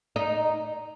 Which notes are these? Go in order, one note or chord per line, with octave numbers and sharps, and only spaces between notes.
D#4